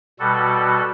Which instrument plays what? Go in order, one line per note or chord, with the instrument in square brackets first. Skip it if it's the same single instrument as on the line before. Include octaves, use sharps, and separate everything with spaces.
[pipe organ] B2 G3 F#4 A4